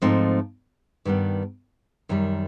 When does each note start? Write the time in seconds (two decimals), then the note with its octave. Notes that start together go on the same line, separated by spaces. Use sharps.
0.02 G#2 F3 A3 C4 D#4
1.05 G2 D#3 G3 B3
2.09 F#2 D#3 G3